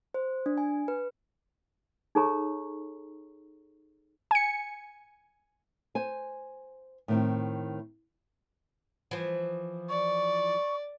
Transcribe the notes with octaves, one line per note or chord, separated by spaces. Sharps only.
C5
D4
G#5
B4
D#4 G#4 A4 C#5 A#5 C#6
G#5 C#7
C5 G#5
A2 D#3 C4
E3 F3
D5 C#6